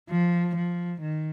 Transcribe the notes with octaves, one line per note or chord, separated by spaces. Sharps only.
F3
F3
D#3